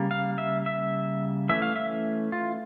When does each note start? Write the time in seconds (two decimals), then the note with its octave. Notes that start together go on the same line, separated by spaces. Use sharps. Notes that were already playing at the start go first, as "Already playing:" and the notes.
Already playing: C#3 G3 A#3
0.11 F5
0.38 E5
0.66 E5
1.49 E3 A3 C#4 E5
1.62 F5
1.76 E5
2.32 F4